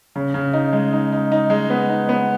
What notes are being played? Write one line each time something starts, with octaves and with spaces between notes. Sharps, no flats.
C#3
C#3
D#4
G#3
D#4
D#4
D#4
G#3
B3
D#4
B3